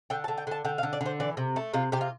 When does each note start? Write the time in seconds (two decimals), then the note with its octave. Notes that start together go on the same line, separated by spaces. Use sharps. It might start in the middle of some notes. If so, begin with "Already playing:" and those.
0.10 D3 G5
0.24 A5
0.28 D3
0.38 G5
0.47 D3 A5
0.65 D3 G5
0.78 F5
0.83 D3
0.93 D5
1.01 D3 C5
1.20 E3 D5
1.37 C3
1.56 A3
1.74 C3 F4
1.92 C3 G4
2.01 F4